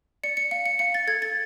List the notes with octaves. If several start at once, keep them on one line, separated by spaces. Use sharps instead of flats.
D5 C#7
C#7
F5 C#7
C#7
F5 C#7
A6
A4 G#6
A6